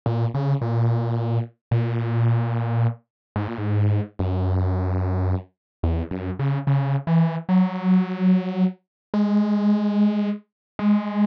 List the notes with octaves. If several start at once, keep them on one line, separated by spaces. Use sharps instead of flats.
A#2
C#3
A#2
A#2
G#2
A#2
G#2
F#2
E2
F#2
C#3
C#3
E3
F#3
G#3
G#3